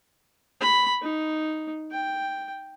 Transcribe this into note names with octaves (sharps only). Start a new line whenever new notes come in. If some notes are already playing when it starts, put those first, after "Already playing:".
B5
D#4
G5